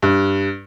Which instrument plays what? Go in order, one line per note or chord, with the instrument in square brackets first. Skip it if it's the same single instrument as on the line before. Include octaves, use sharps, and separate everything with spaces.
[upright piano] G2